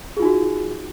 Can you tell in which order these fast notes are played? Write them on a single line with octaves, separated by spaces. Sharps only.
G#4 F4 D#4 F#4